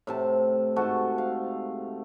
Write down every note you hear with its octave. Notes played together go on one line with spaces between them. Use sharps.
A2 C3 A5
G#2 A3 F#4 A5
F5